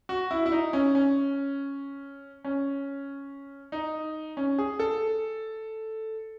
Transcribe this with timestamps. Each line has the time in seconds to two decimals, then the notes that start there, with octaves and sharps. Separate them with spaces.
0.09 F#4
0.31 E4
0.46 E4
0.52 D#4
0.73 C#4
0.95 C#4
2.44 C#4
3.72 D#4
4.37 C#4
4.58 G#4
4.80 A4